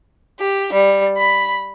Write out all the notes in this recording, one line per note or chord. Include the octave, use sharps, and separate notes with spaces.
G4
G3
B5